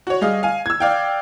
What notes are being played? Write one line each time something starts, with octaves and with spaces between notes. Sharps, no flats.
F#4 C#5
G3 G#4 D#5 F5
F5 G#5
E6 G#6
D5 F5 G5